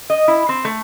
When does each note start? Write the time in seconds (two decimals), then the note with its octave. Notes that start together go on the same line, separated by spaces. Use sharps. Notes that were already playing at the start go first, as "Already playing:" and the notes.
0.10 D#5
0.28 E4
0.49 C4
0.65 A3